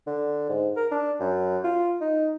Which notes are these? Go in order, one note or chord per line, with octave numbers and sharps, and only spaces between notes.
D3
G#2
A#4
D4
F#2
F4
D#4